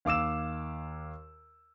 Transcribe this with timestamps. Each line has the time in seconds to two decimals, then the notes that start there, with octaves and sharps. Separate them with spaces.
0.05 D#2 F5 D6 E6 E7